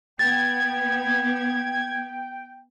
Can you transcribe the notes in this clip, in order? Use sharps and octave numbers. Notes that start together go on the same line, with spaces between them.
B3 G5 G#6 A6